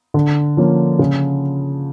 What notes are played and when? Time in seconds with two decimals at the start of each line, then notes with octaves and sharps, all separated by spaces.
0.14 D3
0.57 F3 A#3 C#4
0.99 C#3